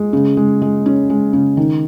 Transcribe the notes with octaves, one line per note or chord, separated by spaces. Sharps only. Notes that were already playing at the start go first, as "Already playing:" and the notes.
Already playing: G#3
C#3
G#3
G#3
C#4
G#3
C#3
D#3